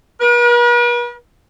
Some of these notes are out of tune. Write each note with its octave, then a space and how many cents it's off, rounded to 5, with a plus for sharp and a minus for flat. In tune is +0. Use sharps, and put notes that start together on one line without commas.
B4 -45